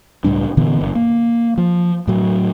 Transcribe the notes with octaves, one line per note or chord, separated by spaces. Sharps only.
C#2 A2 G3 D4
A#2 D3 E3 B3
F#1
A#3
F3
A2 F#3